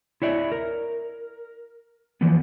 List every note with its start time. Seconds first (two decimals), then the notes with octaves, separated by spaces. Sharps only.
0.22 E4 C#5 D5 E5
0.52 A#4
2.21 E3 F3 A#3 B3